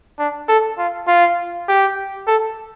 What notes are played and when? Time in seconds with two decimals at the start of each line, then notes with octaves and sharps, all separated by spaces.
0.19 D4
0.48 A4
0.78 F4
1.07 F4
1.68 G4
2.27 A4